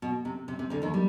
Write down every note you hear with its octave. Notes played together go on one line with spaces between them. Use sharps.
B2
C3
C3
C3
D2 D3
D#2 D#3
G3